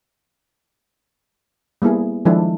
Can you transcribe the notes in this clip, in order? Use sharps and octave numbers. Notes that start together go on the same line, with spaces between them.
G3 A#3 B3 E4 G#4
D#3 F3 G#3 D4 E4 A4